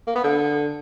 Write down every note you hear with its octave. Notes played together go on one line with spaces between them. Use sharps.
A#3
B3
D3